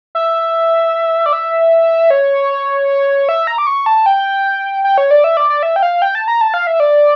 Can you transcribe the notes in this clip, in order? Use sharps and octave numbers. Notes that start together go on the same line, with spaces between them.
E5
D5
E5
C#5
E5
A#5
D6
C#6
A5
G5
G5
C#5
D5
E5
D5
D5
E5
G5
F5
G5
A5
A#5
A5
F5
E5
D5